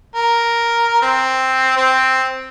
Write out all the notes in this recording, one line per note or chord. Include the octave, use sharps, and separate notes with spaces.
A#4
C4
C4